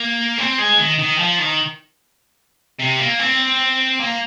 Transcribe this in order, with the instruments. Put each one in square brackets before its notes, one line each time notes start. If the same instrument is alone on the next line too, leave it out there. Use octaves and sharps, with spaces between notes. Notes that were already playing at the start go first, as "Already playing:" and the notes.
Already playing: [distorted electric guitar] A#3
C4
G#3
D#3
D#3
F3
D#3
C3
A#3
C4
A#3